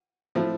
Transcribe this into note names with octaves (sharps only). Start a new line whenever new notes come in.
A2 F3 A3 C4